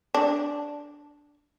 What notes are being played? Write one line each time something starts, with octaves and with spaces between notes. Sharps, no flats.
D4